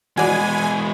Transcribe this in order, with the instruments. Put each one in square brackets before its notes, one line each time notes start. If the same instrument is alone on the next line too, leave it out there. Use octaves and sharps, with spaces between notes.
[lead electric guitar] E3 G#3 [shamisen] F#4 D5 [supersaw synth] G#5